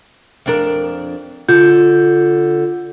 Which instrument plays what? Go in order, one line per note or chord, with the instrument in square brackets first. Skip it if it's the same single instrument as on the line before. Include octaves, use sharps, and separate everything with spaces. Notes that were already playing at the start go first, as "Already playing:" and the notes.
[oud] F2 D4 A#4
[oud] D3 [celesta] F4 G6